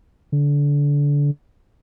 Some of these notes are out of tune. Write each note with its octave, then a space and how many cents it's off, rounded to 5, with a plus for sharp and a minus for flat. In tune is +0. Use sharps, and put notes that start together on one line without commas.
D3 -25